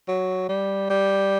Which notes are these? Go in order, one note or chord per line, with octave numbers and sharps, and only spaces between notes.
F#3
G3
G3